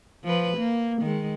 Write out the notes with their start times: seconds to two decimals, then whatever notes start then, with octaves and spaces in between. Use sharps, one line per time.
0.25 F3 B4
0.58 A#3
1.03 D#3 G#3